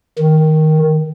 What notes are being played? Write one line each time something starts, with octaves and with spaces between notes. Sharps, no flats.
D#3